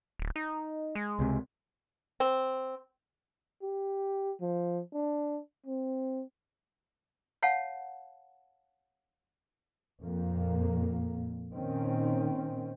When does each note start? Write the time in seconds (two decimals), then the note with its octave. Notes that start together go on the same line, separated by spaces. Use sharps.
0.19 D1
0.36 D#4
0.95 G#3
1.19 C#2 C3
2.20 C4
3.62 G4
4.41 F3
4.93 D4
5.66 C4
7.42 C#5 F5 F#5 A5
10.03 F2 A#2 A#3
11.53 A#2 D#3 C4 C#4